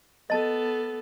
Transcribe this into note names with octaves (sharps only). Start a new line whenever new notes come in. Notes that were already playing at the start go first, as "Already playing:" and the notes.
B3 A4 D#5 A5